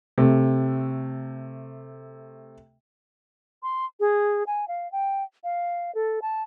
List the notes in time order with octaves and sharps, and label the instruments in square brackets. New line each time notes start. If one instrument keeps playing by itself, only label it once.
[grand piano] C3 A3
[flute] C6
G#4
G#5
F5
G5
F5
A4
A5